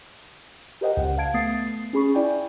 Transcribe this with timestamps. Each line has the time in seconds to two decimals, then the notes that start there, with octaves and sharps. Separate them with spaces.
0.81 G4 A#4 C5 D#5 F#5 G5
0.97 C#2 F#5
1.18 F5 A5 G#6 D7
1.34 A3 B3 D#6 A6 C7
1.93 C#4 G#4 B5 C#6
2.14 E4 D5 G5 G#5